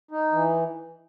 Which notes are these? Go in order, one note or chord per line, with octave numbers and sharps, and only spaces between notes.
D#4
E3